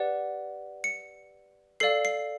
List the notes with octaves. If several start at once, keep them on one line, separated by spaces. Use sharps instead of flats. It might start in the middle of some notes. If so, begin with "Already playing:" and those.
Already playing: G4 B4 D5 F#5
C#7
A4 D5 F5 C7
C7